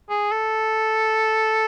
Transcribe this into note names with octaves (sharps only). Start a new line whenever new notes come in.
G#4
A4